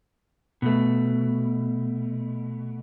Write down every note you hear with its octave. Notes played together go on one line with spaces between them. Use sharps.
B2 A3